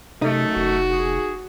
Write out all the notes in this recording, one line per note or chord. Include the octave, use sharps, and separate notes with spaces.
F#2 C3 A3 D#4
F1 F#4
G#4